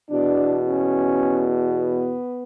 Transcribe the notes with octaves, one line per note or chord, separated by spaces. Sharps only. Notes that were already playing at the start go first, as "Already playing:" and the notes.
E2 B2 D4
C#4
B3